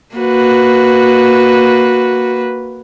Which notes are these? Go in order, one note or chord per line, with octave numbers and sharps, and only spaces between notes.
A#3 F#4 B4